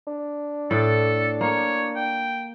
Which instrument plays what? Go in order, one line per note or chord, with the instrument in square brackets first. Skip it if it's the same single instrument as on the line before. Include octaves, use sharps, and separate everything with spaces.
[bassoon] D4
[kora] A2 D5 [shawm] A4
[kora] A#3 [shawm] C#5
[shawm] G5